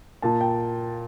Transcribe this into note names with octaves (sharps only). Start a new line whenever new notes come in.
A#2 A5
G5